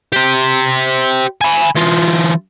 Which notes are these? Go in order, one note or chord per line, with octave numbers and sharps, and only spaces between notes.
G4 C5
G#5 B5
E3 F4